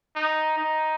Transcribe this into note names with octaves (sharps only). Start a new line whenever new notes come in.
D#4
D#4